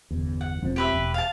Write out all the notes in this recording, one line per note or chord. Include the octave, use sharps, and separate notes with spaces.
G1 E2
F#5
E1 F3 C4
G4 B4 E5
E1
F5 A5